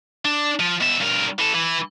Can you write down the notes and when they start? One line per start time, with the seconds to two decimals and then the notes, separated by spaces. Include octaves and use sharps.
0.25 D4
0.60 F3
0.80 B2 E5
1.00 G2 A#4
1.39 E3 A4
1.54 E3